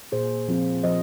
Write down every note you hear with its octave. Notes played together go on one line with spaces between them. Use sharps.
A#2 G#4 C5
F3 C4 F4
F3 C5 D#5